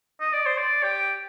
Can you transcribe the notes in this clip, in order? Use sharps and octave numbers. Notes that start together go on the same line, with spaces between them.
D#5
D5
C5
D5
G4